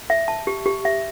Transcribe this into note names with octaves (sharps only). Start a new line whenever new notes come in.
E5
A5
G4
G4
E5